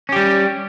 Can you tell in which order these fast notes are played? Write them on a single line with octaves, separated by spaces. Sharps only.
C#4 G4 G3